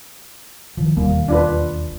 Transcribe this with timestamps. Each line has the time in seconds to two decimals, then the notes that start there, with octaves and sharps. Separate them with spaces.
0.77 D#3 F3
0.97 E1 D#2 G3 A#3
1.28 D4 F4 B4